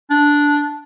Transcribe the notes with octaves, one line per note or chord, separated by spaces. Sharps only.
D4